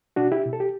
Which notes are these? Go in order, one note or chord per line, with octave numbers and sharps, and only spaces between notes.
B2 D4 F#4
E4 G4
B2
A4
G4